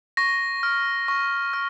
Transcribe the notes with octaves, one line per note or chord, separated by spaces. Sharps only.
C#6 A#6
F6
C#6
F6